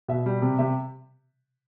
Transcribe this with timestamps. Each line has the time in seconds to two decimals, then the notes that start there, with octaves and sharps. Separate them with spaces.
0.08 B2 E5
0.26 G3
0.42 C3
0.59 C3 E5